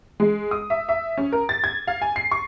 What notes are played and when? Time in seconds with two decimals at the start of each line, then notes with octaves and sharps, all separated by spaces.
0.20 G#3
0.51 D#6
0.70 E5
0.89 E5
1.18 C#4
1.32 A#4
1.49 A6
1.64 G#6
1.87 F5
2.02 G#5
2.16 C7
2.31 C#6